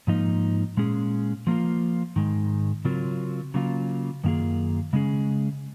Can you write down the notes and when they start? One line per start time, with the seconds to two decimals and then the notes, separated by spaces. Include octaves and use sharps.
0.07 G#2 F3 A#3 D#4
0.77 A#2 G#3 C#4 G#4
1.47 F3 A#3 F4
2.16 G#2 D#3 G#3
2.85 C#3 F#3 C4 F4 A#4
3.54 C#3 F#3 A#3 F4
4.24 F#2 D#3 A#3 F4 G#4
4.93 C#3 G#3 C#4 G#4